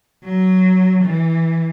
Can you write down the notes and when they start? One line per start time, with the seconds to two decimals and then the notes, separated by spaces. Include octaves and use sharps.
0.24 F#3
1.04 E3